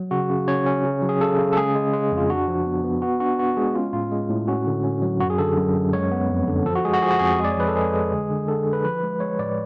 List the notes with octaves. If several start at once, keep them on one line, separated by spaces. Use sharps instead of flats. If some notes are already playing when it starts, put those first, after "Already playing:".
Already playing: F#3
C#3 F#4
C#3
C#4 C#5
C#4
C#3
F#3
G#4
C#3 A4
C#3
A4
G#3 G#4
G#3
G#3
F2
F4
D4 F#4
F3
B3
B3
B3 F#4
D4 F#4
B3 F#4
G#3 G#4
C#4 F4
A2 F4
G#3
A2
C#4 F#4
D3
C#4
F#3
F#2 F#4
G#4
D3 A4
F#2
F#2
G#3 C#5
B3
F2
D3
F3 A4
F#4
G#3 G#4
F#4
F3 G#4
F#4
F2 G#4
G#3
D5
C#5
F3 B4
A4
G#3 G#4
G#3
D3
D3
D3 A4
D3
B4
F3 B4
G#3
G#3 C#5
A2 D5